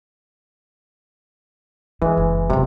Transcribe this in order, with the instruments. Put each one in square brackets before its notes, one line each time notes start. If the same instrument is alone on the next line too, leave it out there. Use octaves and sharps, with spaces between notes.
[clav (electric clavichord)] E3 G#3 [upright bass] E4
[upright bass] F#1
[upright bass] F1 F#2 [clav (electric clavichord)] C3